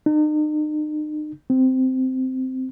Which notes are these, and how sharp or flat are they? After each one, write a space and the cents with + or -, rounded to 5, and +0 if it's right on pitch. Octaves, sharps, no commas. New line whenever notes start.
D#4 -40
C4 -10